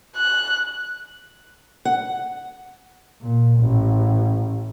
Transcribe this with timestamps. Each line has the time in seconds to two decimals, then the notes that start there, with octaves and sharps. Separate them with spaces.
0.16 F#6
1.85 F#5
3.21 A#2
3.59 A1